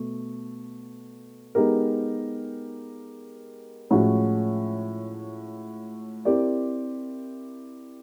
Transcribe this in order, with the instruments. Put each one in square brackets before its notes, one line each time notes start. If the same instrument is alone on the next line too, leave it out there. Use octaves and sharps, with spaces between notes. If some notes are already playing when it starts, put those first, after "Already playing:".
Already playing: [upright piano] B2 A3
G#3 B3 D#4 G4 A#4
A2 F3 G#3 C#4 F#4
C4 E4 G4 A#4 D5